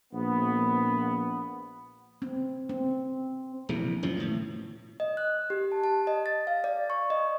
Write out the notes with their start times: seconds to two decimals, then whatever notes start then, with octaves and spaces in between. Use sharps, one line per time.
0.13 A#1 B3
2.22 C4
2.69 C4
3.69 A#1 C3 E3
4.03 F#2 D#3 F3
4.20 A2
5.00 D#5
5.17 F#6
5.50 G4
5.72 A5
5.84 A5
6.07 D#5
6.26 A6
6.47 F5
6.64 D5
6.90 C#6
7.10 D#5